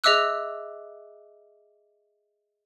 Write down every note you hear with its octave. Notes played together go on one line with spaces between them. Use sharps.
G#4 D#5 E5 D6 E6 F#6